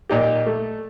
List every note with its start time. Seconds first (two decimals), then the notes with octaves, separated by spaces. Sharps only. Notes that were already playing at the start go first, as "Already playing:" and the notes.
0.09 A#2 D#4 G4
0.46 A3